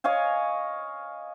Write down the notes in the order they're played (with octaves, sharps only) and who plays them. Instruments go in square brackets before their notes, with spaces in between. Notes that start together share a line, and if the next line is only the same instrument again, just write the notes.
[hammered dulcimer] C#5 D#5 F5 G#5